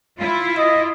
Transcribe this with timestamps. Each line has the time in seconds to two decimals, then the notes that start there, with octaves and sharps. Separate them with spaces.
0.18 E4 F4
0.58 D#5